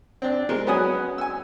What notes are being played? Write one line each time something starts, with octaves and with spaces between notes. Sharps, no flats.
C4 D4
G#3 A#4
F#3 B3 C#4 F#5 G#5 D#6
G#5 E6